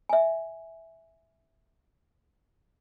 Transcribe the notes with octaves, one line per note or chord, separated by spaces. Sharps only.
E5 G#5